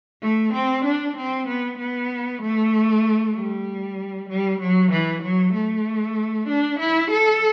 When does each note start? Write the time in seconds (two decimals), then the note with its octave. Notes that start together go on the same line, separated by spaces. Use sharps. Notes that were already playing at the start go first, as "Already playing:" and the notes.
0.22 A3
0.53 C4
0.85 D4
1.16 C4
1.48 B3
1.78 B3
2.42 A3
3.35 G3
4.29 G3
4.60 F#3
4.92 E3
5.23 F#3
5.54 A3
6.48 D4
6.79 E4
7.11 A4